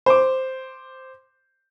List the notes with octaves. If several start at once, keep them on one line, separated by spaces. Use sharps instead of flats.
C5 D6